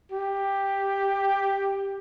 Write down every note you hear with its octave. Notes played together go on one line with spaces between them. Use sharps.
G4